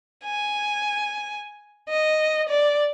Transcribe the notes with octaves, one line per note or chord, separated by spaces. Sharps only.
G#5
D#5
D5